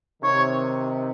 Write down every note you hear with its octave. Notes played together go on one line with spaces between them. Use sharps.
C3 D#3 C#5